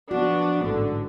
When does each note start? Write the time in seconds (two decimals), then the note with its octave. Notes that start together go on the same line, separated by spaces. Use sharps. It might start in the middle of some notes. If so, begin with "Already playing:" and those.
0.11 F3 B3 D4 F#4
0.62 A1 G#2 D3